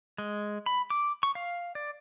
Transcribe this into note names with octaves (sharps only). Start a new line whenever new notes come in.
G#3
B5
D6
C#6
F5
D5